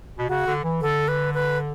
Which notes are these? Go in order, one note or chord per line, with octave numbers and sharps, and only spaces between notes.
B2
C#3 F#4
D3
E3
D3 A4
B4
B4